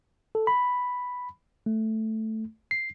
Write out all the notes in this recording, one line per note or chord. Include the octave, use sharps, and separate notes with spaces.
A4
B5
A3
C7